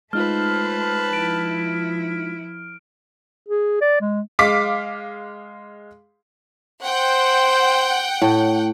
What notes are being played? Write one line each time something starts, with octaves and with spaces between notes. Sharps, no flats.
G#3 A3 D#4 F4 B4 C5 A5 F6
F3 E4 D7
G#4
D5
G#3
G#3 F5 D6 B6
C5 F#5 G5
A2